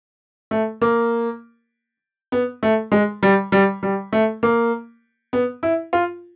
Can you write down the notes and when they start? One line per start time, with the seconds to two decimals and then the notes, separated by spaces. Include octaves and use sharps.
0.51 A3
0.82 A#3
2.32 B3
2.63 A3
2.92 G#3
3.23 G3
3.52 G3
3.83 G3
4.13 A3
4.43 A#3
5.33 B3
5.63 E4
5.93 F4